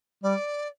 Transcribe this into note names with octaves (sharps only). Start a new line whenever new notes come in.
G3 D5